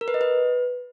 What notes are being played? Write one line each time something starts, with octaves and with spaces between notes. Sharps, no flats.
A#4
B4
D#5
B4